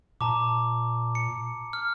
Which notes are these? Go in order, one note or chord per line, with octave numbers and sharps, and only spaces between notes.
A#2 A5 A#5 D6
C#7
F6